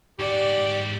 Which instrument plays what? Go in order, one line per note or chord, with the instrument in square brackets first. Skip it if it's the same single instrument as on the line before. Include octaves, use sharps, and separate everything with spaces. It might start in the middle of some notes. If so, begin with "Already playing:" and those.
[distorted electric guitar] G#2 F#4 [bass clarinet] G4 [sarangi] D5